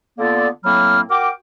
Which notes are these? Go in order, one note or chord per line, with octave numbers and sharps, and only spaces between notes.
D3 A#3 B3 F4 A4 D5
A2 F#3 A#3 C4 B5 F6
F#4 A#4 G5 D6